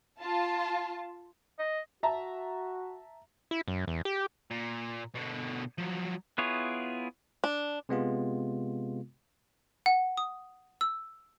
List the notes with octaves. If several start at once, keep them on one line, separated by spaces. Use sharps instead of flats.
F4 A5
D#5
F#4 E5 A5 A#5
E4
F#2
E2
G4
A#2
B2 D3
F3 F#3
B3 E4 F4 G#4 C#5
D4
C3 G#3 B3 F4
F#5
D#6
E6